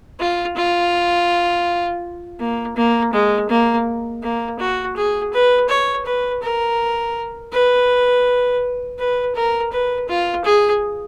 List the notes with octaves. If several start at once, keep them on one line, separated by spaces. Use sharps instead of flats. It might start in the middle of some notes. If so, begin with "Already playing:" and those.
F4
F4
A#3
A#3
G#3
A#3
A#3
F#4
G#4
B4
C#5
B4
A#4
B4
B4
A#4
B4
F4
G#4